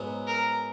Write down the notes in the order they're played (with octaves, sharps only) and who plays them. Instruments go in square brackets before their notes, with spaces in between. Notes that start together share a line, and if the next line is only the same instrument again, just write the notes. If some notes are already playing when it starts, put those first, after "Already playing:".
Already playing: [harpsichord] G#2 F#3 B3
[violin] A#4